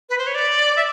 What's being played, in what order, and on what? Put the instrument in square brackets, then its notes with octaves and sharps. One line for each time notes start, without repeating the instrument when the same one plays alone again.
[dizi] B4
C5
C#5
D5
E5